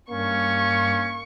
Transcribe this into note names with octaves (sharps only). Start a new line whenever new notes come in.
G2 A#3 C#4 C#6